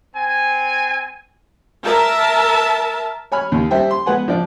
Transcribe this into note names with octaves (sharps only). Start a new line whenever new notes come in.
C4 G#5
A#4 E5 A5
C#5 G#5 B5 F6
D#2
G3 C5 E5 G5
C6
G#3 B3 F#5 G#5
F3 D4 D5